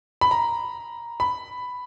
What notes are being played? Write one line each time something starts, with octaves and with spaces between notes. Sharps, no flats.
B5
A#5
B5